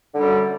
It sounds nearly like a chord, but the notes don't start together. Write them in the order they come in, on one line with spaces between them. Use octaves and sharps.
D3 G3 F#2